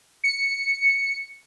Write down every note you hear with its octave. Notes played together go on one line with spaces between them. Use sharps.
C#7